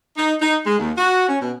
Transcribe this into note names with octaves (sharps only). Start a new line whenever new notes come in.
D#4
D#4
G#3
D#2
F#4
C#4
B2